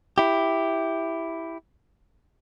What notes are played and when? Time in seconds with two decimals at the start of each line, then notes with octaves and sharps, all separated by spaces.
0.18 E4 G4